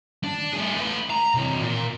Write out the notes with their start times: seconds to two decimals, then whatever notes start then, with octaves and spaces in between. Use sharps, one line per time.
0.24 D4
0.53 A3 G#4
0.76 A3 B4
1.10 A#5
1.34 C3 E3
1.60 A#2